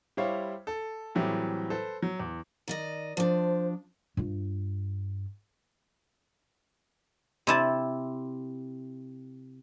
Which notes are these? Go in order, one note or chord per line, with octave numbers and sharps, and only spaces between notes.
G3 E4 C5 C#5 F5
A4
A2 E3 F#3 G3 C4
A4 B4 C5
F#3
E2
D#3 D5 D#5
F3 D4 C5
G2 F4
C3 E4 A5